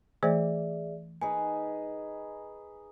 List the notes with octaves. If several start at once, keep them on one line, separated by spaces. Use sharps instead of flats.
E3 A3 G#4 C5 D5 E5
D#4 G#4 B4 G#5